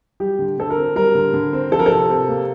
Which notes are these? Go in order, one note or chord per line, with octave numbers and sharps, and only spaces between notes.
G3 G4
D3
D3 A4
A#4
C4
G3 A#4
D3
D3
C4
F3 A4
A#4
C3 A4
C3
A#3